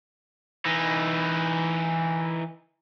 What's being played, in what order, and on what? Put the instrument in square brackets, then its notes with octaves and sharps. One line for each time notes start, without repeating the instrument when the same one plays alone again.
[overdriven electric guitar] E3 D#4